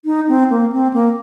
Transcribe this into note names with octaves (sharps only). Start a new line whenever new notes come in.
D#4
C4
A#3
C4
A#3